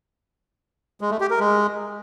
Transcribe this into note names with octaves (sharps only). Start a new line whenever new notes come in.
G#3
A3
G4
A#4
G#3